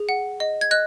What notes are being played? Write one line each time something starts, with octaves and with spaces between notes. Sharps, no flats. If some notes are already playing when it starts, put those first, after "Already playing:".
Already playing: G#4
F#5
D#5
G#6
D#5 F#6